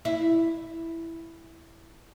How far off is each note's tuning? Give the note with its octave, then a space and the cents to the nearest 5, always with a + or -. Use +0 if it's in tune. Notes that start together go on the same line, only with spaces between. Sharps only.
E4 +0